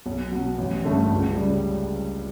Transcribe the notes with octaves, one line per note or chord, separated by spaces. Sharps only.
B1
B2 F#3
A1
G2 D3 A3 C#4
C#2
C#3 G3